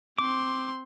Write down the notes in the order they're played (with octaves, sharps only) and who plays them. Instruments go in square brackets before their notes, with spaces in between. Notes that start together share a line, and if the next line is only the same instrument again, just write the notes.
[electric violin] C4 C6 [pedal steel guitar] D6